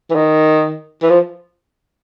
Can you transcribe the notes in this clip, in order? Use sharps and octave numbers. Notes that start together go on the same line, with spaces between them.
E3
D#3
E3
F3